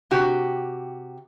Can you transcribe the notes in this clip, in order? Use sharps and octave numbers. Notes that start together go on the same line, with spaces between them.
C3 F#4 G4